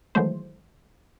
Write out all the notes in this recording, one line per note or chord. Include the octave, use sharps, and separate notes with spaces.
D#3 E3 F#3 G#3 A3 C5